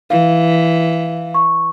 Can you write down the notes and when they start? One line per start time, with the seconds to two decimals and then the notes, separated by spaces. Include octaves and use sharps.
0.10 E3 F5
1.34 C#6